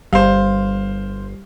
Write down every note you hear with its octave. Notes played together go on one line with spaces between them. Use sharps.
G1 G3 C5 F5